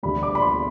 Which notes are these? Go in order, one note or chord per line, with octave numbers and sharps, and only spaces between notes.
D2 D3 G3 B5
D6
B5
C6